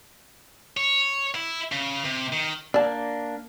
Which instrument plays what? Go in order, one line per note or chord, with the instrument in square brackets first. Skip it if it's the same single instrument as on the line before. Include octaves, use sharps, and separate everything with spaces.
[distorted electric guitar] C#5
E4
C#3
C3
D#3
[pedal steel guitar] A#3 D4 [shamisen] D5 A5